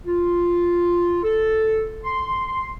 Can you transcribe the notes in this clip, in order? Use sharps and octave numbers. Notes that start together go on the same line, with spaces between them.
F4
A4
C6